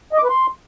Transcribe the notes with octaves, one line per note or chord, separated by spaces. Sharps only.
D#5
D6
B4
C6